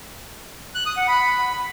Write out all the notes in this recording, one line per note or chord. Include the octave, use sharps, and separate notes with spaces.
F#6
D#6
F#5
B5